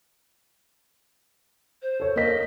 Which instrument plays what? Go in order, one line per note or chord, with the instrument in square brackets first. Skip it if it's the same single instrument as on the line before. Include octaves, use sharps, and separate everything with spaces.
[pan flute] C5
[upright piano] A4 C#5
[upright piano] A#3 B6 [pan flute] D#5